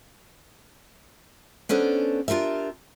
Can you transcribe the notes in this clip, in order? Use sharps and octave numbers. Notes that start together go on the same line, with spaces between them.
B3 C#4 D4 A4 C5
D4 F4 G4 A#4 E5